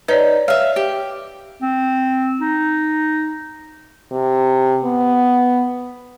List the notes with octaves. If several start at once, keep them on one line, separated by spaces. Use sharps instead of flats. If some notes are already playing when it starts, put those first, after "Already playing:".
D#4 B4 C#5 D5
C#5 E5 F5
G4
C4
D#4
C3
B3